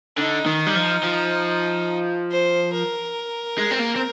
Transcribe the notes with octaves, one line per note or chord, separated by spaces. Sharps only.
D3 D#4
D#3
G3
F3
F3
C5
A#4
G#3
C4
A#3
C4